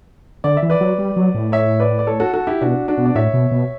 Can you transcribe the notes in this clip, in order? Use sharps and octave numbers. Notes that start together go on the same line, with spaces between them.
D3 D5
E5
E3
B4 D5
F#3
G3
F#3
A2
C#5 E5
B4 D5
D5
A4 C#5
F#4 A4
F#4 A4
E4 G4
B2 D4 F#4
D4 F#4
B2
D5
A2 C#5 E5
B2
B2